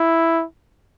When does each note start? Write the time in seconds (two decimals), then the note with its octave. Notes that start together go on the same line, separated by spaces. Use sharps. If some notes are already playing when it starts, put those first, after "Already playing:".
Already playing: E4